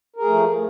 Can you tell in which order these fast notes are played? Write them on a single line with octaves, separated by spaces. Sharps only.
A#4 G#4 A3 F3